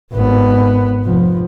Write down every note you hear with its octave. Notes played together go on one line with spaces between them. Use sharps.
G#1 B3
F1 F3